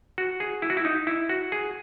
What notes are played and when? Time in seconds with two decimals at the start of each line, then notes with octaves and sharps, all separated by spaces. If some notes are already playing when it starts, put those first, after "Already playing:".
0.18 F#4
0.40 G#4
0.62 E4
0.70 F#4
0.77 E4
0.85 D#4
1.07 E4
1.29 F#4
1.52 G#4